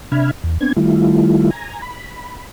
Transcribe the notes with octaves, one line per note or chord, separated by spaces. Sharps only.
C3 D4 E5 B5 F6 G#6
E2
B3 C4 D4 G#6
D#3 G3 A3 E4 F4
G#5 A#5
B5